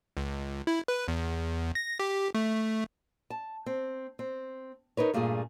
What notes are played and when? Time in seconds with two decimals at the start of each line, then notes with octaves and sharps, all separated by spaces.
0.17 C#2
0.67 E4
0.88 B4
1.08 E2
1.75 A#6
1.99 G4
2.35 A3
3.30 A5
3.66 C4
4.19 C4
4.97 D#4 A#4 B4 C#5
5.14 G2 A#2 A3 F4 G#4